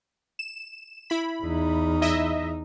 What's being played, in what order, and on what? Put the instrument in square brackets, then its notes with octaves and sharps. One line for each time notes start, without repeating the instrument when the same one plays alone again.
[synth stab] E7
E4 B5
[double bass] E2 D#4
[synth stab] E4 D#5 E5